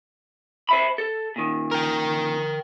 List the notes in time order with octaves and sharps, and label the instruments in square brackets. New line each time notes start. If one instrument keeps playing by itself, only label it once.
[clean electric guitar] C5 E5 B5
A4
A#2 D#3
[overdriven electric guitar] A#4 G5